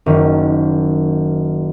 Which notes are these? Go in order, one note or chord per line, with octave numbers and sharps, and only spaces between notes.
F#1 D#3 C#4